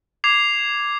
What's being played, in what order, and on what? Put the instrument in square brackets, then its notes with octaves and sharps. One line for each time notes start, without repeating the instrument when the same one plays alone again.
[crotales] D6 G#6 C7 F7